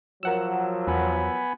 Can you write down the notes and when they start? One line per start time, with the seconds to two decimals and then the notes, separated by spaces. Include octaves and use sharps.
0.23 F3 F#3 A#4 F#5 E6
0.87 E2 B3 G#5 B5